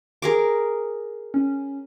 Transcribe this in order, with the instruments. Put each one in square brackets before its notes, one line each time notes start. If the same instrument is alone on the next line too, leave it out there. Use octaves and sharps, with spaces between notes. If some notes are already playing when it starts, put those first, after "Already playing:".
[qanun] G#4 A#4 D6
[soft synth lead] C#4